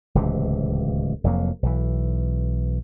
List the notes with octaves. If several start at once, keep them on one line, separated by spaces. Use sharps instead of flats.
D1 C#2 C3 E3
F1 F2 F#3 A#3
B1 E3